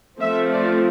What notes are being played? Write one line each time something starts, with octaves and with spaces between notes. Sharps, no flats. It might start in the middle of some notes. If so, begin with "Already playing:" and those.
F3 A3 C4 E5
D5